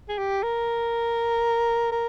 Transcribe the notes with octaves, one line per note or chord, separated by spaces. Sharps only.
G#4
G4
A#4
A#4